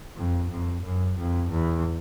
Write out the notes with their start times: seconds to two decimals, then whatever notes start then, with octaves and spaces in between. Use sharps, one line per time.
0.16 F2
0.50 F2
0.83 F#2
1.18 F2
1.50 E2